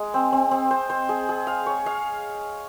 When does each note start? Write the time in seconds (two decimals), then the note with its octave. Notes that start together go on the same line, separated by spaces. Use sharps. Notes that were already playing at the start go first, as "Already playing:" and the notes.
Already playing: G#3 G#4
0.14 C4
0.32 C4
0.51 C4
0.71 C5
0.90 C5
1.09 G#4
1.29 G#4
1.47 F5
1.66 C#5
1.86 F5